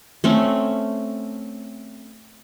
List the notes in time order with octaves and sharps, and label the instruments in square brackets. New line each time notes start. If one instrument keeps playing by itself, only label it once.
[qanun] A3 C4 C#4